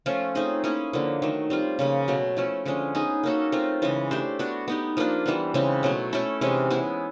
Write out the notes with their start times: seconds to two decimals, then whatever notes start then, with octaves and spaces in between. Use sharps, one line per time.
0.06 F3 A3 C#4 F4
0.35 A3 C4 D#4 G#4
0.64 A#3 C#4 E4 G#4
0.93 D3 F3 A#3
1.22 D#3 F#3 A3
1.50 G3 C4 F4
1.79 C#3 F3 A#3
2.08 B2 F#3 A3
2.37 F3 A3 C#4 E4
2.65 D3 F3 G#3 C#4
2.95 B3 D#4 G#4
3.23 A#3 C#4 F#4 A4
3.52 A3 C4 F4 A#4
3.82 C#3 E3 G#3
4.11 A3 D4 G4 C5
4.39 B3 D4 F#4
4.68 B3 D#4 G4
4.97 F3 A#3 D4 F4
5.26 E3 G3 B3
5.54 C#3 E3 G#3 C4
5.83 B2 F#3 A3
6.13 A3 C#4 E4 A4
6.41 C3 E3 G#3 C#4
6.71 B3 E4 G#4